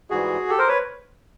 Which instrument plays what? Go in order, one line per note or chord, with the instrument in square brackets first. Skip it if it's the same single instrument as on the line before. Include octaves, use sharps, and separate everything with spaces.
[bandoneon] G#2 E3 G3 F#4 G#4
G4 A4
A#4 C5
B4 C#5